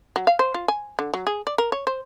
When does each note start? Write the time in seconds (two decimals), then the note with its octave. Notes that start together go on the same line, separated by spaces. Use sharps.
0.16 F#3
0.27 F5
0.39 C5
0.54 F4
0.68 G#5
0.99 D3
1.14 F#3
1.27 G#4
1.47 D5
1.58 A#4
1.72 C#5
1.87 C5